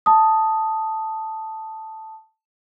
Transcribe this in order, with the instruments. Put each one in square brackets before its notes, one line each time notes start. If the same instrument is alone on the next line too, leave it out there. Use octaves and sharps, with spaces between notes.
[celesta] A5 D#6